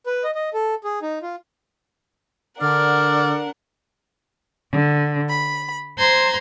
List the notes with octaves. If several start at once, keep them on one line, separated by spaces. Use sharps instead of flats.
B4
D#5
D#5
A4
G#4
D#4
F4
D3 D4 A#4 D5 F#5 F6
D3
B5
C5 A#5 C6 G#6